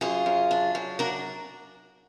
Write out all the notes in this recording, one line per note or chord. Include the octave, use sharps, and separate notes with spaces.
F#2 F4 G#4
F#2
D4
F#2
D4 F#4 A#4